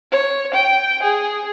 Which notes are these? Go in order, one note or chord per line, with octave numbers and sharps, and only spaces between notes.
C#5
G5
G#4